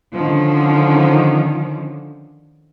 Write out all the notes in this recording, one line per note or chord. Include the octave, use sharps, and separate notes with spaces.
D3 D#3 F3 C#4